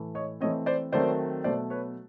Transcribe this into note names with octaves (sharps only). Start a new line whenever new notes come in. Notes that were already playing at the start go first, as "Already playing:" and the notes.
Already playing: A2 E3 A3
C#5 D#5
E3 A3 C4 C#5 D#5
C5 D5
D#3 F#3 A3 C4 C5 D5
B2 F#3 A3 C5 D5
B4 C#5